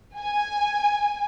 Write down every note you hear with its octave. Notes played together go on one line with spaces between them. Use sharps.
G#5